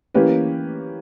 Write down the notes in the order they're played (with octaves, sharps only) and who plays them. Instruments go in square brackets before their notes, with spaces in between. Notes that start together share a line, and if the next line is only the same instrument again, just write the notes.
[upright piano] E3 A#3 C#4 G4 B4